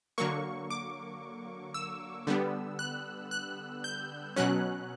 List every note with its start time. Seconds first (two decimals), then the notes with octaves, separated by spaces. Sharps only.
0.18 D3 F#3 A#3 C#6
0.70 D6
1.74 E6
2.27 D3 G3 B3
2.79 F#6
3.31 F#6
3.84 G6
4.36 B2 F#3 C#4 F#6